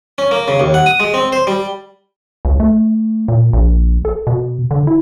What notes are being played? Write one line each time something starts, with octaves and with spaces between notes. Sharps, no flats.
C#4
A#3
C#3
D#2
F#5
D#6
G#3
C4
C5
G3
C#2
A3
A#2
A#1
A4
B2
D3
E4